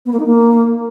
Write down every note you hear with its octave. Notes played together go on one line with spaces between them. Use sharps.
B3
A#3
D#4
A#3